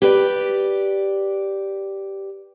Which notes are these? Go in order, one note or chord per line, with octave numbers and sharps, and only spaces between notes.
G4 B4 D5